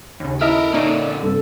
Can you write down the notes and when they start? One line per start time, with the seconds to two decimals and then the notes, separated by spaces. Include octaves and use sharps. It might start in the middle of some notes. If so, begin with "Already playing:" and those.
0.20 D#2 C#3
0.41 E4 A4 A#4 D#5 E5 F6
0.73 A#2 D3 A#3 C#4 D#4 D5
1.23 G2 C3 A4